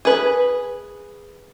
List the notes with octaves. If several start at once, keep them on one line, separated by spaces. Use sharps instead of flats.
G#4 B4